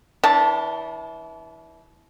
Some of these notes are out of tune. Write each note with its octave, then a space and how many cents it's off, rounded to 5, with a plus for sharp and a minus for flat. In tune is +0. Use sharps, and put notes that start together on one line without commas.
E3 -20 D4 -40 A5 +0